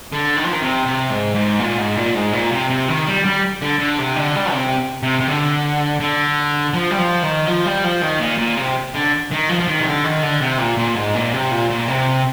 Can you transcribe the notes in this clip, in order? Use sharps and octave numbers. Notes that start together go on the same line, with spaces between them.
D3
D#3
F3
D#3
C3
C3
G#2
G#2
A#2
G#2
A#2
G#2
A#2
C3
C3
D#3
G3
G3
D3
D3
C3
D3
G3
C3
C3
C3
D3
D3
F3
G3
F3
D#3
F3
G3
F3
D#3
A#2
A#2
C3
D3
D#3
F3
F3
D#3
C3
D3
D#3
D3
C3
A#2
A#2
G#2
A#2
C3
A#2
A#2
C3